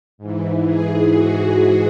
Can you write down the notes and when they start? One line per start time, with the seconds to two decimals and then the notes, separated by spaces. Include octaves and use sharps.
0.18 G#2 E3
0.64 G#4
1.10 F#4
1.57 G#4